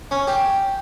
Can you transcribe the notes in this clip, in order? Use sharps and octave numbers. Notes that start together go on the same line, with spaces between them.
C#4
G4